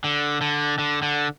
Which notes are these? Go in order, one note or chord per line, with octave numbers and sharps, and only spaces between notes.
D3
D3
D3
D3